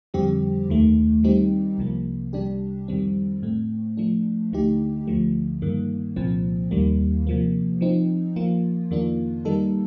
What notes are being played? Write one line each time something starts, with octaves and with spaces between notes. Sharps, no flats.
F2 D3 G3 C4 G4
D#2 D#3 A3
D#3 G3 C4 D#4 G4
C2 C3 F3 A#3
C2 C3 G3 D4 G4
F2 D#3 G3 C4
A2 A3 C4
F3 A3 D4
D2 D3 A3 D#4 G4
D2 D3 F3 A3
G2 D#3 A#3
C2 A#2 F3 C4
D#2 D#3 G3 A#3
C3 F3 A#3
F3 C4 D#4
F3 A#3 F4
F2 D#3 A#3 D4 F4
D#3 G3 A#3 D#4 A4